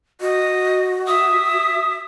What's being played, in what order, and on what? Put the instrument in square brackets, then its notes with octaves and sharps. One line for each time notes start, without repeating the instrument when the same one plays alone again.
[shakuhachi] F#4 [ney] D#5
[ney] E5 [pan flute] D#6